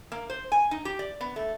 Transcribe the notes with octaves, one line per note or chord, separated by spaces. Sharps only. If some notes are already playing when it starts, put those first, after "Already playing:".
A#3
C5
G#5
D#4
G4
D5
B3
A3